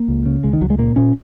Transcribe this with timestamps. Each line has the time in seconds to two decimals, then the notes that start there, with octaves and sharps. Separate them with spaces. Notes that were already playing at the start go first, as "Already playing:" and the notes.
Already playing: A#3
0.08 C#2
0.26 C#3
0.44 C#2 G#3
0.53 D#3
0.61 C#2 F#3
0.70 G#3
0.78 A#2 A#3
0.96 A#2 C#4